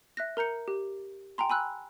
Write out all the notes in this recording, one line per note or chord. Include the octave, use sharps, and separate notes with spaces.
E5 F#6 A#6
A#4 A#5 G6 C#7
G4
G5 G#5 A#5 C6
G#5 B5 E6 F#6